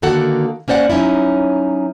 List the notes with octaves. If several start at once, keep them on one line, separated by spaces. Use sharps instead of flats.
D3 D#3 A#3 F#4 A4 F#5
A#3 C#4 C5 D5 F#5
F#3 C#4 D#4 E4